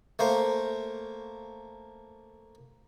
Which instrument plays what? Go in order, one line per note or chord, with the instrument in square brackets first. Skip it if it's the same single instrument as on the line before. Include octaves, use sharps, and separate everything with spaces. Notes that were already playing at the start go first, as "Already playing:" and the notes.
[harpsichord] A3 A#3 C5